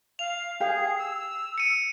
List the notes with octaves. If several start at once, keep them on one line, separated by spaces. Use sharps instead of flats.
F5 F7
G4 G#4 F5
E6
C#7 D#7